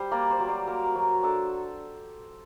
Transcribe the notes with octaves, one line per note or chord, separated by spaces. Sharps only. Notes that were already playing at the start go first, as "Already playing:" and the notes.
Already playing: G3 C5
A#3 D5
C5
F#3
D5
A#3 A#4
F#3
D4 A4